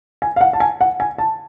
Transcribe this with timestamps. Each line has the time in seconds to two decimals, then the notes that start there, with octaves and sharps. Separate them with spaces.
0.22 G#5
0.36 F5
0.41 F#5
0.53 A5
0.60 G#5
0.81 F#5
1.00 G#5
1.18 A5